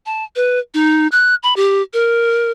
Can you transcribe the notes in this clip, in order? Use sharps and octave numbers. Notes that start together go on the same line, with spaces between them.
A5
B4
D#4
F#6
B5
G4
A#4